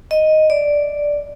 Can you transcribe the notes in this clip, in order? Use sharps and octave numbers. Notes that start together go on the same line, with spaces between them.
D#5
D5